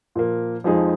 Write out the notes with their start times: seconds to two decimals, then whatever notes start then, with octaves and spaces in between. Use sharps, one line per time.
0.15 A#2 F3 A#3
0.64 F2 F3 G#3 D#4 G#4